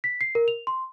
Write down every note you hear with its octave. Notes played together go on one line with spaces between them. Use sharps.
B6
C7
A#4
F7
C6